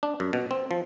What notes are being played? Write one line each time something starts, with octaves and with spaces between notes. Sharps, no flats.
D4
F#2
B2
C4
F3